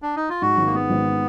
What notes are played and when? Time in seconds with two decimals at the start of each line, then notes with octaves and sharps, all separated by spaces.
0.02 D4
0.16 D#4
0.29 F4
0.42 G#2 F#4
0.57 G#1
0.66 A#3
0.74 G#3 B3
0.90 G#1